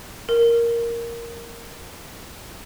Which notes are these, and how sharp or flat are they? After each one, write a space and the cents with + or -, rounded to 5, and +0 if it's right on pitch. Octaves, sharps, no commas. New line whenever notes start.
A#4 +0